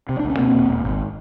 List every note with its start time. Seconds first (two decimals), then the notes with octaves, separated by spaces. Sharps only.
0.09 C3
0.19 D4
0.24 D2
0.30 C#4
0.39 B2 A#3 C4
0.55 E1
0.69 E1
0.84 G#1